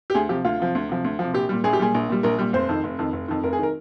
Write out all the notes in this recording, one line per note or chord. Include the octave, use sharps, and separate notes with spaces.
G4
D2 G#4
C3 F3 G4
D2 F4
C3 F3
D2
C3 F3
D2
C3 F3
A#1 G4
A#2 G3
A#1 G#4
G4
A#2 G3 G#4
A#1
A#2 G3
A#1 A#4
A#2 G3
F1 C5
F2 D#3
F1
F2 D#3
F1
F2 D#3
F1 A#4
G#4
D#3 A#4